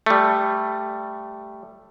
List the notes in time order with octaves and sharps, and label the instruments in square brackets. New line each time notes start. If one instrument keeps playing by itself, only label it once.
[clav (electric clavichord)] G3 A3